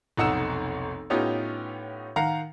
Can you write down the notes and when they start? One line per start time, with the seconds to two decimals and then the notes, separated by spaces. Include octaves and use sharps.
0.17 F1 B1 D#4 F#5 E6 E7
1.10 A2 B3 C#4 D#4 F4 G4
2.16 D#3 F5 F#5 A#5